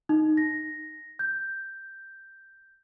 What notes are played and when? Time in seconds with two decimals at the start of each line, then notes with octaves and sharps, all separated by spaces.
0.09 D#4
0.37 A#6
1.19 G6